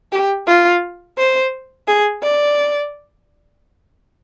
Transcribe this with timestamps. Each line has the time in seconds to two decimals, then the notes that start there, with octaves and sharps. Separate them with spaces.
0.12 G4
0.48 F4
1.18 C5
1.88 G#4
2.23 D5